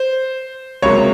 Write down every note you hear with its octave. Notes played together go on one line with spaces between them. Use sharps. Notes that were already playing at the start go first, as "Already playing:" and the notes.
Already playing: C5
C#2 C3 F#3 A#3 C#5